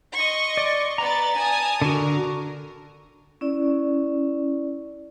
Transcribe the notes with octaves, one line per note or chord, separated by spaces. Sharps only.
D#5 C6 C#6
D5
B3 D5 A#5 A6
G#5 A5 D#6
D3 F#4 A#4
C#4 E4 D5